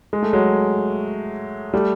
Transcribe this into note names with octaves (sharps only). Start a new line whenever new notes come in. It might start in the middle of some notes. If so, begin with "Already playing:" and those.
G#3
A3
F#3 G#3
G3 A3